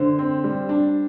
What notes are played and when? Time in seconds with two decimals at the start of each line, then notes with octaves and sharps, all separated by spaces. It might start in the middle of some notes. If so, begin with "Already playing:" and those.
Already playing: D3 C5
0.19 C4
0.44 G3
0.69 D4